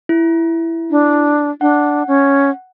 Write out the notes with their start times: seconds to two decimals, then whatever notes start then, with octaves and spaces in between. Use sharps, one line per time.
0.09 E4
0.91 D4
1.61 D4 F#5
2.07 C#4